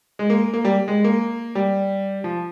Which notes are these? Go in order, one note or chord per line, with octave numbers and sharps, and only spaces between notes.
G#3
A#3
A#3
G3
G#3
A#3
G3
F3